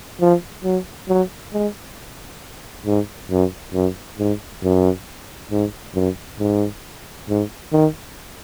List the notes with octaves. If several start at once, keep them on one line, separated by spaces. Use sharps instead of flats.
F3
F#3
F#3
G#3
G#2
F#2
F#2
G#2
F#2
G#2
F#2
G#2
G#2
D#3